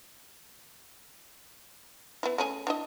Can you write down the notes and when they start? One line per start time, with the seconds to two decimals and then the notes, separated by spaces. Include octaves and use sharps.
2.23 B3 E4
2.38 A3 C#4 G#4
2.67 D4 E4 D#5